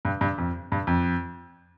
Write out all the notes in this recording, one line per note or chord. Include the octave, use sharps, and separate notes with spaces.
G2
G2
F2
G2
F2